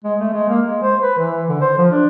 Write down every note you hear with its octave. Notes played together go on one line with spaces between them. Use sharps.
G#3
A3
G#3
A#3
G#3
C5
B4
E3
D3
C5
F3
D4